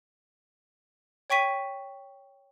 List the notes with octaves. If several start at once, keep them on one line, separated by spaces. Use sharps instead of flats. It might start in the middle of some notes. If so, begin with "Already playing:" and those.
C#5 G5 C#6 B6 D#7